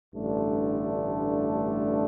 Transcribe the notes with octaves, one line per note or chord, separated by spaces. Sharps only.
A1 G2 D3 A3 D4